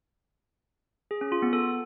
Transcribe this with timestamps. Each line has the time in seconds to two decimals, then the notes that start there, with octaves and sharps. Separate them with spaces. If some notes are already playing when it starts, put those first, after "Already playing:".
1.11 G#4
1.21 C#4
1.32 F4
1.42 B3
1.53 A4